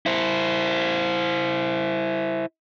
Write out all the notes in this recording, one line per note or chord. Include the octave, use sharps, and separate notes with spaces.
E4 C5